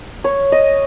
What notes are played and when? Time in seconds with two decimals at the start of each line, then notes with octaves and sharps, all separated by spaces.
0.24 C#5
0.52 D#5